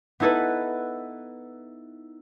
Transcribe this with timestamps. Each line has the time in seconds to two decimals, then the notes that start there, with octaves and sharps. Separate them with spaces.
0.20 B3 D#4 E4 A4 B4